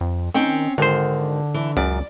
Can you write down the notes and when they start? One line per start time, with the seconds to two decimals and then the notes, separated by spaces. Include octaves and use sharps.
0.01 F2
0.34 D#3 C4 C#4 G5
0.78 G#1 D3 D#3 C5
1.54 E3
1.77 C#2 F#2 D5